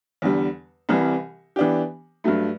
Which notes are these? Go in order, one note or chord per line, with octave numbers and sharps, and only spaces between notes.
E2 D3 G3
C2 C3 E3 G3
E3 B3 D4 G4
G2 F#3 A3